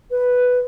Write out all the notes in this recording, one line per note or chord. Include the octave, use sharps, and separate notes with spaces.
B4